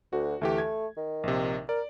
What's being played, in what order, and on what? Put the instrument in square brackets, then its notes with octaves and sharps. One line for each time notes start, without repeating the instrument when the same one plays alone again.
[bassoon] D2 [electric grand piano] F#4
[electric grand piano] D2 E3 G4 [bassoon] A3
[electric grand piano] G#6
[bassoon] D#3
[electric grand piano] A#1 C3
[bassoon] A#4 [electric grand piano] D5